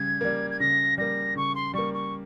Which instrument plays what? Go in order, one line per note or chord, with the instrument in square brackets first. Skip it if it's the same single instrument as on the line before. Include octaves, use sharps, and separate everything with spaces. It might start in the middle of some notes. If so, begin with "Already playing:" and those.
Already playing: [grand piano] C#3 G3 [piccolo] G#6
[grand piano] G3 A#3
[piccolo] G#6
[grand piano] C#3 [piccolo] A#6
[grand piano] G3 A#3 [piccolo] A#6
[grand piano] C#3 [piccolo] C#6
[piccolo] C6
[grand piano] G3 A#3 [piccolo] C#6
[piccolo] C#6